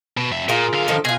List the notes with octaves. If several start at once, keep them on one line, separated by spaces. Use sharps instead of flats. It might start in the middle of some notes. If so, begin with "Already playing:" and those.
B2
F2 E5
A#2 A#3 F4 G#4
D3 F5
D#3 F3 A4
B2 F4 G#4